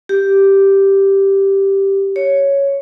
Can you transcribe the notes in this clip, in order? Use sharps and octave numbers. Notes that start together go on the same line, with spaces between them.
G4
C#5